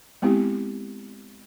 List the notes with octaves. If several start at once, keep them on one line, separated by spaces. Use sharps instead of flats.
G#3 B3 C4 E4 G4